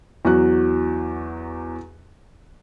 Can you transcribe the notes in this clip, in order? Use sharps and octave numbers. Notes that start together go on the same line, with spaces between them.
E2 F#3 F#4 F#6